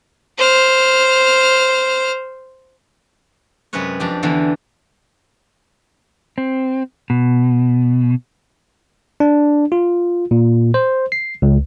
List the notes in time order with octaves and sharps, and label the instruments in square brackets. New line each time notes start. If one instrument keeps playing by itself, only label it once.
[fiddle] C5 F6
[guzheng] F#2 C3 G#3 C#4 B4 C#5
F2 D4 G4
E2 D3 E3
[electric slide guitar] C4
B2
[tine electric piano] D4
F4
A#2
C5
C7
C#2